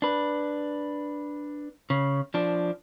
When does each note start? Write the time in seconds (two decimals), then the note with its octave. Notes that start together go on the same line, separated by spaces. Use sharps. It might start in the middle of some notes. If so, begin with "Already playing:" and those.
0.02 D4 B4
1.90 C#3
2.34 F3 D4